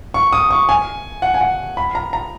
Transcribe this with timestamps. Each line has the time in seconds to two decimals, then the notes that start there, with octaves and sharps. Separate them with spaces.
0.14 C#6
0.33 D#6
0.51 C#6
0.69 G#5
1.22 F#5
1.34 G#5
1.41 F#5
1.77 B5
1.95 A#5
2.13 A#5